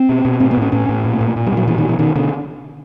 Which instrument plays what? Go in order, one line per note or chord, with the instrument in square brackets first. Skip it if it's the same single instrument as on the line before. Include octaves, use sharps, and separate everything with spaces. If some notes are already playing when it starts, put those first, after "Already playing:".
Already playing: [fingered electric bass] C4
B2
B2
A2 C4
B3
A2 C#4
A2 C#4
A2
A#2
A#2
A#2
G3
A#2 F#3
B2 E3
D#3
B2 E3
B2 D#3
B2 D3